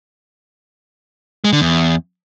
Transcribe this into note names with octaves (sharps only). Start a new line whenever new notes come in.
G#3
D3
E2